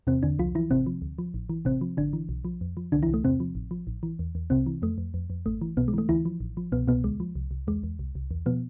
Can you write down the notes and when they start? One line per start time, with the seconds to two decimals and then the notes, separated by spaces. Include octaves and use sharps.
0.07 E2 C3 C4
0.23 E2 D3 D4
0.39 C2 F3 F4
0.55 E3 F3 E4
0.71 G#1 C3 C4
0.86 F3
1.02 D2
1.18 F3
1.34 A1
1.49 E3
1.65 A1 C3 C4
1.81 F3
1.97 G#1 D3 D4
2.13 E3
2.29 B1
2.45 F3
2.61 F2
2.77 F3
2.92 C2 D3 D4
3.03 E3 E4
3.08 C2
3.14 A3
3.24 E2 C3 C4
3.40 F3
3.55 A1
3.71 F3
3.87 A1
4.03 E3
4.19 E2
4.35 E2
4.50 C2 C3 C4
4.66 E3
4.82 F2 A3
4.98 F2
5.14 F2
5.30 F2
5.46 G#1 A3
5.61 E3
5.77 B1 B2 B3
5.88 G#3
5.93 E3 A3
6.09 D2 E3 E4
6.25 F3
6.40 A1
6.57 F3
6.72 C2 B2 B3
6.88 C2 B2 B3
7.04 D2 G#3
7.20 F3
7.36 C2
7.51 C2
7.67 E2 G#3
7.83 E2
7.99 C2
8.15 C2
8.31 E2
8.46 B2 F3 B3